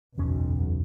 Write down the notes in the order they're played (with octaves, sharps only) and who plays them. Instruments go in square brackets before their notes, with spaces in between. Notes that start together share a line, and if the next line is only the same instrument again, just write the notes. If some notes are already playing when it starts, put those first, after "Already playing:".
[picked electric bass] F#1 E2 C#4 [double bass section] B1